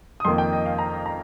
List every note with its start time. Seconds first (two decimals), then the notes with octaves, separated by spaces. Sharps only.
0.20 D#6
0.25 F2 D#3 A#3 C6
0.38 G5
0.53 D#5
0.66 F5
0.79 A#5
1.06 A#5